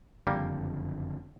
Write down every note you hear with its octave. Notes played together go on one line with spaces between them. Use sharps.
F#1 F2 D3 G3 A#3